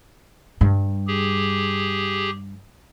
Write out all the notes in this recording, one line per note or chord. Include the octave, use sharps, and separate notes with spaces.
G2 G3
G4 G#4